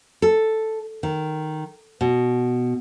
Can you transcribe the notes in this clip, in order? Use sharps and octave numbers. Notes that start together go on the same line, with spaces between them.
A4
D#3
B2